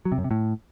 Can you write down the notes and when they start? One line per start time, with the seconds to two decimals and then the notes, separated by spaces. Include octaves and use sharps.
0.05 F#3
0.12 C3
0.18 F#2
0.24 C3
0.31 A2